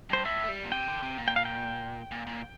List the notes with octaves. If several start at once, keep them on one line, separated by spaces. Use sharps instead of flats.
G2 C5
A2 E5
A3
G3
A#2
C3 G5
D3
C3
A#2
G5
F5
G5
A#2
A#2